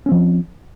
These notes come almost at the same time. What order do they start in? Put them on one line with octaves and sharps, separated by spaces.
C#4 C4 F3